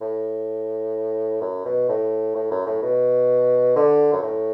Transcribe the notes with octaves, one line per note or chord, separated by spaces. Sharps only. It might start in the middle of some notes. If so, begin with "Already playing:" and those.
A2
F#2
B2
A2
A2
F#2
A2
B2
D3
F#2
A2